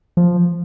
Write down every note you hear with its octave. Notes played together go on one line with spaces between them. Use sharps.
F3